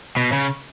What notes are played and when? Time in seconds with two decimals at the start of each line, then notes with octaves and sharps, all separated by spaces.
0.17 B2
0.32 C#3